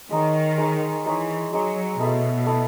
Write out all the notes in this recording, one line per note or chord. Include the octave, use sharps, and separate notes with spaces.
D#3 G#3 D#4 G#4 C#5
G#3 D#4 G#4 C#5
E3 G#3 D#4 G#4 C#5
F#3 G#3 D#4 G#4 C#5
B2 A3 E4 A4 D#5
A3 E4 A4 D#5